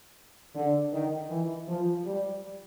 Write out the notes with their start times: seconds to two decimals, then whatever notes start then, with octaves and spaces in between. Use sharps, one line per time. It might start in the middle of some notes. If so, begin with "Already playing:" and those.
0.55 D3
0.93 D#3
1.30 E3
1.68 F3
2.05 G3